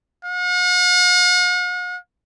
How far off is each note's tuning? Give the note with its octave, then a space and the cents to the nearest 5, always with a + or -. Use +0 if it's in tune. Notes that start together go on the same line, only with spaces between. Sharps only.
F#5 -45